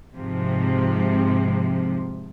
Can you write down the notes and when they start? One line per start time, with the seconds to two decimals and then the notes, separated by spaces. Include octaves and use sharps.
0.15 G#2 C3 F3